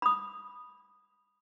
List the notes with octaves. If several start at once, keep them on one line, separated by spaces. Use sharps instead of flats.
B5 D#6